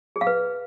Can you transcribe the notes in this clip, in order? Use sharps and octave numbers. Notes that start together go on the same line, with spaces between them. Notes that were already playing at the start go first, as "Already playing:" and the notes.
G#4
F5
B4